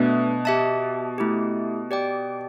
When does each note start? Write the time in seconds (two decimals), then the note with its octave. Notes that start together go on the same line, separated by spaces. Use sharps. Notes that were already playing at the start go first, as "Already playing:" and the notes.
Already playing: B2 A3 D4 B4 E5
0.45 G4 E5 A5
1.18 A3 E4 G4
1.91 G4 D5 G5